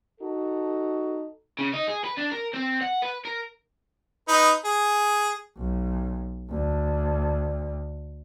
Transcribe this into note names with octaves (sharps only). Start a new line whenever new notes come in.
D#4 F#4 A4
C#3
D#4
G#4
B4
D4
A#4
C4
F#5
B4
A#4
D#4 B4
G#4
B1
D2